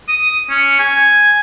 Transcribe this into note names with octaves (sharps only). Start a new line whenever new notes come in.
D#6
C#4
G#5